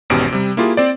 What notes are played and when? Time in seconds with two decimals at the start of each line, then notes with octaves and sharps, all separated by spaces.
0.10 G#1 E2 B2 C#4 G4 D7
0.32 C3 G3
0.57 A#3 E4 F4 G4 G#4
0.77 C4 C5 D5